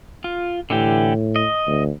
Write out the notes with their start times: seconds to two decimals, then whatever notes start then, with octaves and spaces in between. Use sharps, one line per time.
0.24 F4
0.70 A2 D3 E3 G4
1.36 D#5
1.67 D2